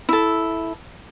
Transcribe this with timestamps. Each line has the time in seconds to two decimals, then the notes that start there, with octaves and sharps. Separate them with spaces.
0.09 E4 A4